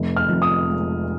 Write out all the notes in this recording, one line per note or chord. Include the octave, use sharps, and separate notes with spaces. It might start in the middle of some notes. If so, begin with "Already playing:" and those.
Already playing: F1
F6
F2
D#6
G#3